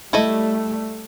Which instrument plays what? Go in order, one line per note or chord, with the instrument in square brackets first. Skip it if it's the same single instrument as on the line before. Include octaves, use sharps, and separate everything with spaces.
[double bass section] G3 A3 [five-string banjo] E4 A4 D#5